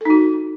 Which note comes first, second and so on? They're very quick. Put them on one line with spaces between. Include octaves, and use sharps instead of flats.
A4 D#4 F#4